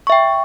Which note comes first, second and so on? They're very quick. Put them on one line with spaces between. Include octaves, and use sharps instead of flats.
C#6 E5 G5